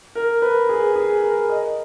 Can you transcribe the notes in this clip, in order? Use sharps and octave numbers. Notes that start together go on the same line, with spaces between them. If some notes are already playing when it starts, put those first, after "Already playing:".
A#4
B4
G#4
G#4
A#4
D#5